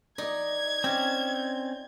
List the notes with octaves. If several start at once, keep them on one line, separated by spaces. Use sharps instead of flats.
D#4 D5 D6 G#6
C4 C#4 G4